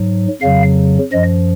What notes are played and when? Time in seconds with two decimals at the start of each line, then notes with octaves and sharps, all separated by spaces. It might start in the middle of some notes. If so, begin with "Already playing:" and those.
Already playing: G#2 F#3
0.41 F2 C#3 F#3 F5
1.12 F#2 F3 D#5